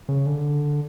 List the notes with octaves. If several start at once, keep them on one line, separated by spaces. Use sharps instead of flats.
C#3
D3